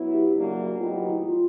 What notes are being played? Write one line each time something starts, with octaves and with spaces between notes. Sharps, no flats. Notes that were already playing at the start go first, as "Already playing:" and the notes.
Already playing: F#3 B3 E4
G4
C#3 F#3 A#3 D4 F#4
A2 F#3 B3 D#4 F4 G4
F4
E4
F4